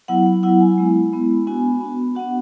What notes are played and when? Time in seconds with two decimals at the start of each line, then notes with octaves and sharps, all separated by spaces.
0.08 F#3 B3 E4 F#5
0.26 F#5
0.43 F#3 B3 E4 F#5
0.60 G#5
0.78 G#3 B3 E4
1.13 G#3 B3 E4
1.47 B3 D4 F#4 G#5
1.81 B3 D4 F#4
2.16 B3 D4 F#4 F#5